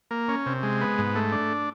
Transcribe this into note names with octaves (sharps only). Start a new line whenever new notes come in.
A#3
C#4
C3
G#3
B3
G#2
A3
D4